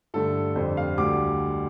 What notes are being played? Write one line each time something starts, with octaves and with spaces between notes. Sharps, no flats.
G2 D3 A3 A4
F2 D3 G3 C5
F5
D2 D3 G3 D6